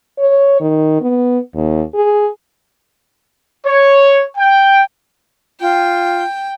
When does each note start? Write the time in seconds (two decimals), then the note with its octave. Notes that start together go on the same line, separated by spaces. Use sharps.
0.18 C#5
0.60 D#3
1.01 B3
1.54 D#2
1.95 G#4
3.67 C#5
4.37 G5
5.61 F4 G5